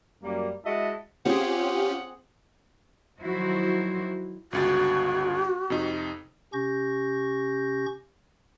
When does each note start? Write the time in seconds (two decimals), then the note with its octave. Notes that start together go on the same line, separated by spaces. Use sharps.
0.23 F#2 G3 A#3
0.65 G#3 E4 F#4 D#5 E5 A5
1.25 C4 C#4 F4 G4 G#4 F#5
3.21 D#3 F3 F#3 E4 F#4 C5
4.53 G1 C#2 F#4 A6
5.70 F2 C3 D#4
6.53 C3 C#4 G4 C#6 G6 A#6